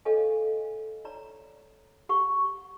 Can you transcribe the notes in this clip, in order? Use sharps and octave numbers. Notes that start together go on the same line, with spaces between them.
A4 C#5 D#5 F5 G#5
C#5 D5 A#5
G4 F#5 C#6